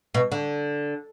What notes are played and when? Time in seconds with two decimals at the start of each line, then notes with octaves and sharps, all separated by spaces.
0.15 B2
0.32 D3